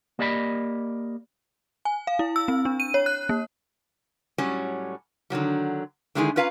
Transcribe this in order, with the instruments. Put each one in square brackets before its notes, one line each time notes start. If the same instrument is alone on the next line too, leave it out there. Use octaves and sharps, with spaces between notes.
[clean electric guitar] A#3 G4 D5 D#5 F5 B5
[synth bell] G#5
F5
E4
E6
C4
D4
D#7
C#5
F#6
A#3
[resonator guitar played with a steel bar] A2 F#3 G3 C#4
D3 D#3 F#3 G3
D3 D#3 G#3 D#4 E4 G#4
C#4 F4 B4 F5 F#5 A#5